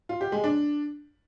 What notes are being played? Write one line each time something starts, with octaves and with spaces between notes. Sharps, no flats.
F4
G4
G#3
D4